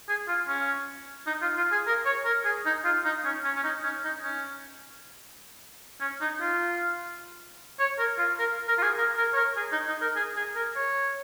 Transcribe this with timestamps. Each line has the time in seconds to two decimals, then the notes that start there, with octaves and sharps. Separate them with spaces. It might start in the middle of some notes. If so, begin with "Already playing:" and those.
0.09 G#4
0.28 F4
0.47 C#4
1.27 D#4
1.42 F4
1.57 F4
1.72 G#4
1.86 A#4
2.05 C#5
2.25 A#4
2.45 G#4
2.66 D#4
2.84 F4
3.04 D#4
3.24 C#4
3.44 C#4
3.56 C#4
3.63 D#4
3.83 C#4
4.04 D#4
4.23 C#4
6.01 C#4
6.21 D#4
6.41 F4
7.79 C#5
7.98 A#4
8.18 F4
8.39 A#4
8.68 A#4
8.78 F4
8.82 G#4
8.97 A#4
9.17 A#4
9.33 C#5
9.37 A#4
9.56 G#4
9.72 D#4
9.87 D#4
10.01 A#4
10.16 G#4
10.36 G#4
10.56 A#4
10.76 C#5